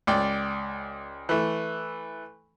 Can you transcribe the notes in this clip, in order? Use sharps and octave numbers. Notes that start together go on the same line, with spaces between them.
C#2 D5 G5
E3 A3